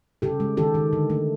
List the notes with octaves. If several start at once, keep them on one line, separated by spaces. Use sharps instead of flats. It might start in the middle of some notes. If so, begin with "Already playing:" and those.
C#3 G4 A4
G#3
D#3 G4 A4
D#3
D3
A3